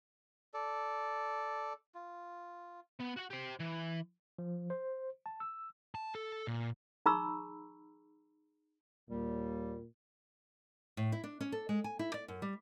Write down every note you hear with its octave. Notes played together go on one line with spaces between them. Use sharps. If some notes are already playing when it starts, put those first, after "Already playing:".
A4 D5
F4
B3
F#4 F#5
G4 C5
E3
F3
C5
A5
E6
A5
A4
A#2
D#4 G#4 A#5 B5 C#6 E6
D#2 A#2 G3
A2
E4
D4
C#4
A4
G#3
G#5
E4
D5
F#2
G3